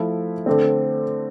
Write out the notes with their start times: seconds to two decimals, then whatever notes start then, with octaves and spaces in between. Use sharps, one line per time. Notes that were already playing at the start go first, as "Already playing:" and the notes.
Already playing: F3 A3 E4
0.46 D3 A3 C4